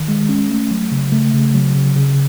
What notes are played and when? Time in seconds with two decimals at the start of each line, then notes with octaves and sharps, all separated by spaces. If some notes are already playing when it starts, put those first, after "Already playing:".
Already playing: D#3
0.08 G#3
0.29 C#4
0.50 A3
0.71 F#3
0.92 C#3
1.12 A3
1.33 C#3
1.54 F#3
1.75 C#3
1.96 C#3